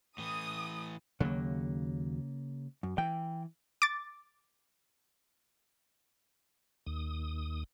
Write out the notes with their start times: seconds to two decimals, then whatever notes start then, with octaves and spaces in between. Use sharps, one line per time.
0.18 A2 E3 D#6
1.20 D#2 C#3 F#3 A#3
2.83 F#2
2.98 E3 G5
3.82 D6 A6
6.86 D#2 D#6